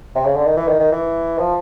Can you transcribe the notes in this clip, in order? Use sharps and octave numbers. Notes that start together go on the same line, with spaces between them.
C3
C#3
D3
D#3
E3
D#3
D#3
E3
F3